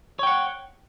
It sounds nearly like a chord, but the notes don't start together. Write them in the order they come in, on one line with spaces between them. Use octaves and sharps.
C#5 G5 F#5